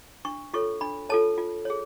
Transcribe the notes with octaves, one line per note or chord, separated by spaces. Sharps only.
D4 C#6
F4 A4 C#5 C#6
D4 B5
F4 A4 C#5 A5
F4
G#4 C#5